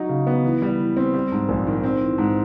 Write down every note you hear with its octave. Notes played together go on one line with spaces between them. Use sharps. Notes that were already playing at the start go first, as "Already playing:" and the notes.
Already playing: F#3 D#4
C#3
B3
E3
G3
E3
C4
G3
G#2
A#1
D#3
C4
E3
G#2